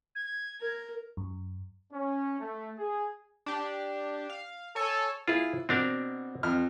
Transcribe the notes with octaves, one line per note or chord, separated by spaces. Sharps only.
G#6
A#4
F#2
C#4
A3
G#4
D4 G4
F5
A4 C#5 G#5
E4 F4 G#4
B2 C4 D4 A#4
F2 F6